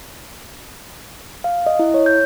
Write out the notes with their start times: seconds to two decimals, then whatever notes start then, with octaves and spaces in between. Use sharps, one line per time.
1.44 F5
1.66 D#5
1.79 E4
1.94 C#5
2.06 G6